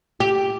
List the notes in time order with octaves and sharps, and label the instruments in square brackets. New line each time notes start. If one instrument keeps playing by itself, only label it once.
[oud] G4